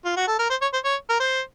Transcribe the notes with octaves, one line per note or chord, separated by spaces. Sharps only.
F4
F#4
A4
A#4
C5
C#5
C5
C#5
A#4
C5